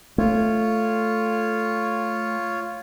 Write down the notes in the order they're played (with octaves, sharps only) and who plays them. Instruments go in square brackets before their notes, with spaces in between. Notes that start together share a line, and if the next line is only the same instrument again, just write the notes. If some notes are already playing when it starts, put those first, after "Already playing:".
[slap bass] A3 [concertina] F4 C#5